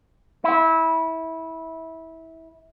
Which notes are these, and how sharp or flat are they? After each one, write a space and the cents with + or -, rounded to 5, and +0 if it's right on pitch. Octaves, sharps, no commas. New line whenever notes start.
E4 -20